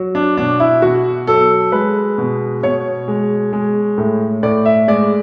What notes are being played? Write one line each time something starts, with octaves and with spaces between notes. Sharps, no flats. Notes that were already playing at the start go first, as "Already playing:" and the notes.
Already playing: F#3
D4
B2 D4
E4
B2 F#4
F#3 A4
G#3 B4
B2
B2 C#5
G#3
G#3
A2
A2 D5
E5
G#3 D5